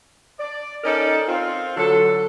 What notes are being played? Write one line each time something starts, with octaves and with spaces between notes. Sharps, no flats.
D5
C#4 D#4 A4 A#4 D5
C4 F4
D3 F#3 A4